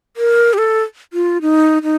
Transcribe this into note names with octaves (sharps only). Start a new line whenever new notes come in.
A#4
G4
A4
F4
D#4
D#4